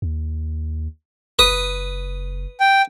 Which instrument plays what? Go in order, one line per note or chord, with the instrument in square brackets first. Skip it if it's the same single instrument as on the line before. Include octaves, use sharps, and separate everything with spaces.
[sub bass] D#2
[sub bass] F#1 [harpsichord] B4 D#6
[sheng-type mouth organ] G5